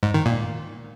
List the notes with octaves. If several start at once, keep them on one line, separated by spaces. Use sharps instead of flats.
G#2
D#3
A#2